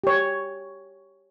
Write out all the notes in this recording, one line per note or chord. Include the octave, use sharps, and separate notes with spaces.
G4 C#5